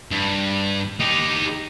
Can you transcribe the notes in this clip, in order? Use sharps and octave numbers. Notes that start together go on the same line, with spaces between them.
G2
D#4 G4